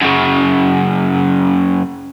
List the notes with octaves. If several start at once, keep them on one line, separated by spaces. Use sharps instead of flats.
F#2 C#3